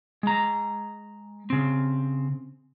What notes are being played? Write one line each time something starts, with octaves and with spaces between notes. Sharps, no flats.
G#3 A#5
C#3 C4